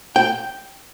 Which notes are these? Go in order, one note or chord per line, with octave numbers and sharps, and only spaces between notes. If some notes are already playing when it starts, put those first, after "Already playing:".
G5